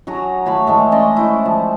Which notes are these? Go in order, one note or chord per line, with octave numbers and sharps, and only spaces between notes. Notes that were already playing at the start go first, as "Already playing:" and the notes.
F#3 F#4 G#4 A#5
A3 C#5 F5 B5
E3 G#3 A3
C#4 D5 D#5 C6
E4 C5
F3